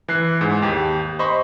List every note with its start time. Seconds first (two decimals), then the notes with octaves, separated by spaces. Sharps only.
0.08 E3 F#6 C7
0.41 G#2
0.62 D#2 G4
1.19 C5 D#5 B5 C#6